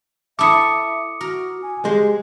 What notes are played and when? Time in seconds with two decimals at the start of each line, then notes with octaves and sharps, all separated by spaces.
0.39 E4 A4 E5 D6 D#6 C#7
1.21 F#4 A#4
1.62 G#5
1.85 G#3 G4 C5